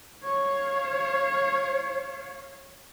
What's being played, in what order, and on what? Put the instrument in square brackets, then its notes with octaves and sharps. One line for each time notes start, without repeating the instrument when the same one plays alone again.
[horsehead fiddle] C#5 F5